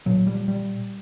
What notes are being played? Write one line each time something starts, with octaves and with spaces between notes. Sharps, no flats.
A#2 F#3
G3
G3